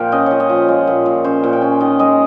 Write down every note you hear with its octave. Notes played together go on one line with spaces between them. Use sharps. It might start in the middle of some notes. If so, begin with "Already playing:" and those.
Already playing: A#2 F3 A#3 F5 G5
C#4 D#5
F3 C#5
D#5
F3
G#3
A#2
A#2
C#4 C5
A#2
G5
C#4
D#3 D#5
G#3 D#5